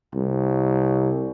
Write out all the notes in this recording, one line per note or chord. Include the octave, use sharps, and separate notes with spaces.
C2